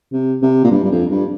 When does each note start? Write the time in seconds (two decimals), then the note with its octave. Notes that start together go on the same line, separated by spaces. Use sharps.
0.13 C3
0.43 C3
0.64 A#2
0.71 G2
0.84 G2
0.91 F2
1.11 G2